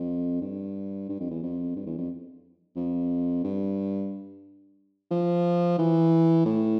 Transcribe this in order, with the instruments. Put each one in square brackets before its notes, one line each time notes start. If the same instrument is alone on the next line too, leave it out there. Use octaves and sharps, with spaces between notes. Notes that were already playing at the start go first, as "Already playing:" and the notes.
Already playing: [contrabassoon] F2
G2
G2
F2
E2
F2
G2
E2
F2
F2
G2
F3
E3
A2